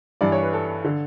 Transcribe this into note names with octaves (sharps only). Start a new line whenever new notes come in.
G2 E3 D5
C#5
B4
A4
D3